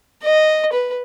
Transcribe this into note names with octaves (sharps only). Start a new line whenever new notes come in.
D#5
B4